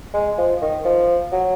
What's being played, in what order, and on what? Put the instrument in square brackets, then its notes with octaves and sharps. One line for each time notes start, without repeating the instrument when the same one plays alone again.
[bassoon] G#3
F3
D#3
F3
F#3